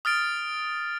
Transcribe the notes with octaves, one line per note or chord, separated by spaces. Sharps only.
D#6 F6 A6 D7